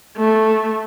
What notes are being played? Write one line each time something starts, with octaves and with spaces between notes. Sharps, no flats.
A3